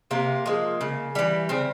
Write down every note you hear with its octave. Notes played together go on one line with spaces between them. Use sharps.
C3 A#3
F3 G#3
C#3
E3 G3
C#3 C4